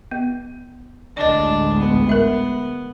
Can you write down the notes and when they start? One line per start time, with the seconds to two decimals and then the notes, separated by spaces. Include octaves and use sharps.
0.11 B3
1.17 A1 D2 G#3 D4 D5 D#5
1.79 B3
2.09 A#4 E5